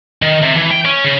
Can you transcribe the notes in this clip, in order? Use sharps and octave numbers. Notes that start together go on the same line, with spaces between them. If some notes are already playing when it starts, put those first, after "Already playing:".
D#3
C3
E3
G5
C#4
C#3